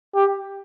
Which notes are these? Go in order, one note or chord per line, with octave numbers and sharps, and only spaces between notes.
G4